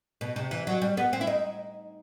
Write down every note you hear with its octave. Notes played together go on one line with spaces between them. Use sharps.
B2
C3
E3
F#3
G3
B3
C4
E4
D#4